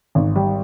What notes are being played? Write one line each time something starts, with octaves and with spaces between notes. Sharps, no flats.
G#1
G3